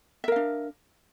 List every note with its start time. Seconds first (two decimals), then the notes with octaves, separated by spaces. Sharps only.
0.24 E5
0.28 A#4
0.32 F5
0.36 D4